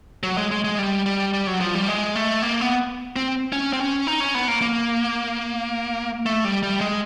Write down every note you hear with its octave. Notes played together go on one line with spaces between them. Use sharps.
F#3
G#3
G#3
G#3
G3
G3
G3
F#3
F3
G3
G#3
A3
A#3
B3
C4
C#4
C4
C#4
D#4
C#4
B3
A#3
A#3
A3
G3
G3
G#3